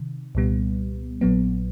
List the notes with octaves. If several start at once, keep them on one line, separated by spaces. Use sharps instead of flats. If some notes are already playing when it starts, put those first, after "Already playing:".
Already playing: C3 D#3
C2 A#2 G3 B3
A#1 A#2 F#3 B3